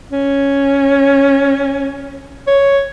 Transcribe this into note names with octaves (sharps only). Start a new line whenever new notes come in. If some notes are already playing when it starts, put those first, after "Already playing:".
C#4
C#5